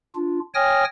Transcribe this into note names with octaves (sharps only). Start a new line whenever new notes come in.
D4 F4
C#5 G5 G#5 D#6 F6 A#6